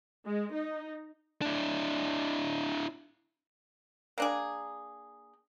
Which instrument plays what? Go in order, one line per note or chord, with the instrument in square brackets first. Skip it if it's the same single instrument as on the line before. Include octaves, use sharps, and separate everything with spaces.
[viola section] G#3
D#4
[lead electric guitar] D4 E4
[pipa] A#3 D4 G#4